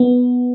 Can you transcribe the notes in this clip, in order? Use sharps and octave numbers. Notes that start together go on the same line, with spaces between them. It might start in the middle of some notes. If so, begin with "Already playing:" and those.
Already playing: B3